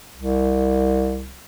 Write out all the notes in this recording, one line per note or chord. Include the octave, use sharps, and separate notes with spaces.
C2